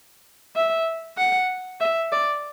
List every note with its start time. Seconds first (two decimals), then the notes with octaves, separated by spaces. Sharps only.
0.56 E5
1.18 F#5
1.81 E5
2.12 D5